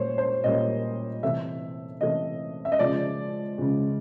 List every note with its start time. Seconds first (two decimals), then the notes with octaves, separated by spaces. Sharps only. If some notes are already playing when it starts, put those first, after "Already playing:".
Already playing: A#2 G3 A#3 C5 C#5
0.18 C5
0.44 A#2 G3 A#3 D#5
1.23 C3 E3 A3 E5
2.01 C3 E3 A3 D#5
2.65 E5
2.72 D#5
2.79 C#3 F3 G#3 D5
3.58 C#3 F3 G#3